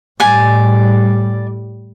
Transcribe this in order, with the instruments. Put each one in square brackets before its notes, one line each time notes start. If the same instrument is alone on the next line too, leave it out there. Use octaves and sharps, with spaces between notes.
[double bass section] A2 G3 [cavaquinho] D5 G#5